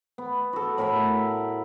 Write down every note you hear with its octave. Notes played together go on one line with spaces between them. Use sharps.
B3
F#4 A4
A2 A#4 E5 B5